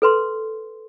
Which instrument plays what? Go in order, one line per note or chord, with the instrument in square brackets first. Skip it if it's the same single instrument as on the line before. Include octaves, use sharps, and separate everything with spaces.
[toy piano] A4 B4 C6